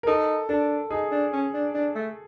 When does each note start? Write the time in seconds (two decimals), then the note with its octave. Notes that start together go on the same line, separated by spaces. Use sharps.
0.03 A#4
0.07 D#4 A4
0.49 D4 A4
0.91 D#4 G#4
1.12 D4
1.33 C#4
1.54 D4
1.74 D4
1.95 A3